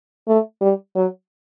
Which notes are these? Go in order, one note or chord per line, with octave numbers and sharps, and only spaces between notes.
A3
G3
F#3